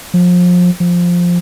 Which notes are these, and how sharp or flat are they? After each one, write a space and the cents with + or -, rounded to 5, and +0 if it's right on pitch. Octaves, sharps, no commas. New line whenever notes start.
F3 +30
F3 +5